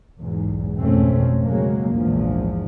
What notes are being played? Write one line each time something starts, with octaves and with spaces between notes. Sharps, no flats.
B1 E2 G#2
G#1 F2 B2 A3 C4 C#4
C#3 F#3 G#3 A#3
A#1 E2 G#2 F3